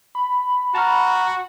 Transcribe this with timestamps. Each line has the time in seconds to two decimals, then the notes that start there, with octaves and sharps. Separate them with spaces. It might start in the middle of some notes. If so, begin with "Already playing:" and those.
0.15 B5
0.75 F#4 A5 A#5 F6